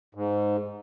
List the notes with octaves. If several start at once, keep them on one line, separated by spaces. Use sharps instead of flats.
G#2